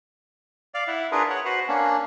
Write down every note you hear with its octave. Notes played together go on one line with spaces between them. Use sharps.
D5 F5
E4 E5 F#5
D4 F4 G#4 A#4 B4
C#5 F#5
F#4 B4 C5 F#5
A#3 C#4 D4